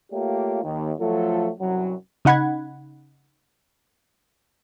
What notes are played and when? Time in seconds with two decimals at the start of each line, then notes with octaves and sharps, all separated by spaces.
0.12 A3 A#3 F4 G4 C#5
0.63 D#2
1.00 F3 F#3 A3 F4 A4
1.60 C2 F#2 F#3
2.25 C#3 D#4 F#5 B5 G#6